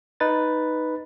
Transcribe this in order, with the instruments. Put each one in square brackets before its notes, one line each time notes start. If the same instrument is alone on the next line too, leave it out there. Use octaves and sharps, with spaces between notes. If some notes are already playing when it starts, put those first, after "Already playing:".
[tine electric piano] D#4 B4 A6